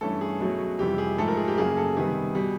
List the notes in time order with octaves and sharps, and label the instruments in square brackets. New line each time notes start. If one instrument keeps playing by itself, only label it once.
[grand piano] G2 E3 A3 C#4 A4
G#4
B2 F#3 A3 C#4
F2 C3 E3 G3 G4
G#4
G#2 F3 A3 A4
A#4
G#4
G4
F#2 C#3 F#3 A#3 G#4
A4
C3 D#3 G3 B3 G#4
B2 G3